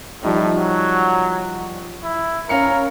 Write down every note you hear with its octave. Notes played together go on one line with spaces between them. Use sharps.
A2 F3 G3 D#4
F#3
E4
C#4 A#4 F5 C#7